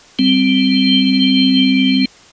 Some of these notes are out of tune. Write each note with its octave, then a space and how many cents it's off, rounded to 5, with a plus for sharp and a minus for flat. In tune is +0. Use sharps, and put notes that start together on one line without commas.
G3 +0 C4 +0